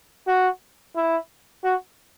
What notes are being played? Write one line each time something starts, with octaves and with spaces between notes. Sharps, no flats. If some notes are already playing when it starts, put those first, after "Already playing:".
F#4
E4
F#4